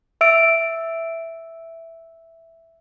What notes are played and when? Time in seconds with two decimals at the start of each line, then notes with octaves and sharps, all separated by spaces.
0.21 E5 E6 D7